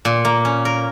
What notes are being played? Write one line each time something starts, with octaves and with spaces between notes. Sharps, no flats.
A#2
A#3
C#4
A#4